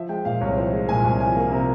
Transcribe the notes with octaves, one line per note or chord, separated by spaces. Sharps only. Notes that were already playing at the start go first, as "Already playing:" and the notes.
Already playing: F3 E5
G#3 G5
A#2 F5
C2 C#5
F3 C5
G#3
A#2 G#5
C2 G#5
F3 G#5
A#3
C3 A#5